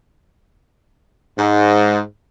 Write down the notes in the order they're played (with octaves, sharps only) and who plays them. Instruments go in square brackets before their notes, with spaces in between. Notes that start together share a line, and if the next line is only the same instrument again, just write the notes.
[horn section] G#2